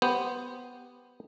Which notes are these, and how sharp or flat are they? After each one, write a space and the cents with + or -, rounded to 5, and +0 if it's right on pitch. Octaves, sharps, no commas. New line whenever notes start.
B3 +0 G4 +0 C5 +0